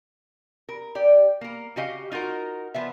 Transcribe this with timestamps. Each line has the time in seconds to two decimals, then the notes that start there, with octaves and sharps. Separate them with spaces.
0.69 A#4
0.95 G4 D5
1.41 A#3 A#4
1.76 C#3 F#4 G4 D#5 F5
2.12 D#4 F4 F#4 A#4
2.74 F3 B3 E5